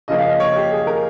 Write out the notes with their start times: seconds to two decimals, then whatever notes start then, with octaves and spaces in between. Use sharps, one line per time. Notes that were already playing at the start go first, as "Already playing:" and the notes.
0.08 C#3 F3 A#3 D#5
0.19 F5
0.24 D#5
0.40 C#5
0.56 G4
0.72 G#4
0.87 A#4